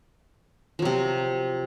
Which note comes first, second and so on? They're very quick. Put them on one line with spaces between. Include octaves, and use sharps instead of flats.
F3 F#3 C3